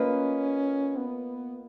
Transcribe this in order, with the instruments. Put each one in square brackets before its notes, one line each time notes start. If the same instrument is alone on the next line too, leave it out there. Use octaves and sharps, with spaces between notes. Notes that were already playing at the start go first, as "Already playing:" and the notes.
Already playing: [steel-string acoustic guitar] A#3 F4 B4 D#5 [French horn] C#4
[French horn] B3